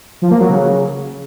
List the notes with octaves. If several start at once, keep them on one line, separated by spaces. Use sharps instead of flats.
F3
A#3
F#3
C#3